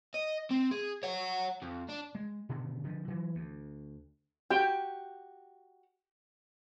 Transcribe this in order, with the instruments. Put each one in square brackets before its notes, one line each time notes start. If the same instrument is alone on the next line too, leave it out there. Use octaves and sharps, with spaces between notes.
[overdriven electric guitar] D#5
C4
G#4
C#5 F#5
F2
D4
[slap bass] G#3
B2 D3 D#3
D3 F3
E3 F#3
D2
[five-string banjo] F#4 G4 [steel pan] G5